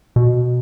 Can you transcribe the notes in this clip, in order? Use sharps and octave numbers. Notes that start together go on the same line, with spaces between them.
B2